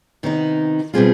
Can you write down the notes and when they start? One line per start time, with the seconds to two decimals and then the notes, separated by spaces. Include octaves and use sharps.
0.23 C3 D#3 B3 D#4
0.94 B2 G3 C4 F4 G#4